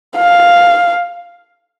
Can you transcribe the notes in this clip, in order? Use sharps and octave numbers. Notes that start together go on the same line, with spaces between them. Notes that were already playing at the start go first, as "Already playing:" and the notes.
F5